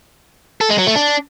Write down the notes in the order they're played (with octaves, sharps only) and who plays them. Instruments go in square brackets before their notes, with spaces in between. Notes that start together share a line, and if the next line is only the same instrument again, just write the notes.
[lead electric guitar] A4
G#3
F#3
A3
D4